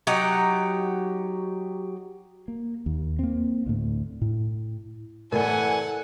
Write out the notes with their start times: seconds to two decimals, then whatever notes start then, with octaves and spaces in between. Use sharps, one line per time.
0.07 F#3 D#4 G4 F#5
2.48 A#3
2.86 D#2
3.19 A#3 C4
3.66 D2 A2
4.21 A2
5.32 A2 C3 E3 A4 A#4 D5 F#5 G#5